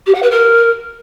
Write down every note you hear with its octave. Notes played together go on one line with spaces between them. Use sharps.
G4
F#5
B4
A#4